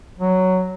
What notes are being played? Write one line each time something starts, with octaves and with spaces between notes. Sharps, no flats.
F#3